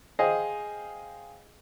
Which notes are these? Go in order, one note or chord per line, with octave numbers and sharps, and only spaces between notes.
G#4 C5 D#5 F5 G5